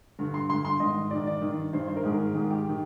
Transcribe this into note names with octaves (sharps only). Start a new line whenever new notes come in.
G2 D3
C6
G2 D3 C6
C6
G#2 D#3 D#5
G#2 D#3 D5
D5
G2 D#3
G2 D#3 C5
C5
A#4
G#2 D#3 G#4
A#4
G#2 D#3 G#4
G4
D#3